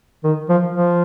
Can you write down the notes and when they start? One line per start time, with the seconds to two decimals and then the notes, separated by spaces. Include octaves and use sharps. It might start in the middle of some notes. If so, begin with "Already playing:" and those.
0.24 D#3
0.49 F3
0.75 F3